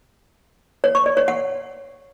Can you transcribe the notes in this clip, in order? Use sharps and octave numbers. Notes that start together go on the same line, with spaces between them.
C#5
C#6
D5
C#5
F#5